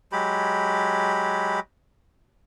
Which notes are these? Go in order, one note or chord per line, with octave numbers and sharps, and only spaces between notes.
F#3 G#3 G4 B5